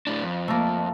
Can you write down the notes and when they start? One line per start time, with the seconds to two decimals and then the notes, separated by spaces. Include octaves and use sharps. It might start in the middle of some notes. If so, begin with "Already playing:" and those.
0.07 A2 D4
0.24 F2
0.48 A3 A#3